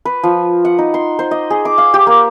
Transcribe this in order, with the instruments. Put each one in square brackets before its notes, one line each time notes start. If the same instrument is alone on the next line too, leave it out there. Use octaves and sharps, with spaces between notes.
[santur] B4
F3
F#5
D#4
C6
C5
D#5
G#4
D6
F5
G4
A#3